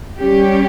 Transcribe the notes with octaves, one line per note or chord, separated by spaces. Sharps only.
G3 C#4 G4